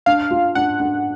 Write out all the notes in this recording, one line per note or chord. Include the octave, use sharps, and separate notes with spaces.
D4 F5
F4
D4 F#5
D4